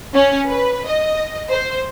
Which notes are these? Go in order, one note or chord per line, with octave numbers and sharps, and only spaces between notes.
C#4
B4
D#5
C5